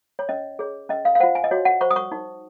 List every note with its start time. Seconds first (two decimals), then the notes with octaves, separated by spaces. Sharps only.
0.19 C#5
0.29 C#4 D#5
0.59 G#4 C#5
0.89 C#4 D#5
1.05 F5
1.15 F5
1.20 F4 C5 F#5
1.35 G#5
1.44 D#5
1.51 F#4 C#5
1.65 F#5
1.81 C5 C#6
1.91 D#6
1.96 C#6
2.12 D#4